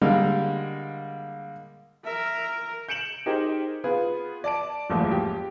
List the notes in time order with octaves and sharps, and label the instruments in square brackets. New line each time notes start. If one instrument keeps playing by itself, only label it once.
[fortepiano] D3 G3 G#3 A#3
[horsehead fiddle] A#4 [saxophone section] E5
[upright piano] G6 C#7 D7 E7 F#7
D#4 G4 G#4 A#4 C5
B3 F4 G#4 B4
D5 A5 D7
F#1 E2 G#2 F3 A3 A#3
G4